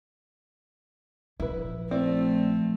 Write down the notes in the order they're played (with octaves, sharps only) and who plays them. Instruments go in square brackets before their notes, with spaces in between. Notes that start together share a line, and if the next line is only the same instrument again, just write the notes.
[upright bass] A#1 F3 [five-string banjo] E4 B4
[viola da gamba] A3 [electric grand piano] C4 [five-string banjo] E4 D5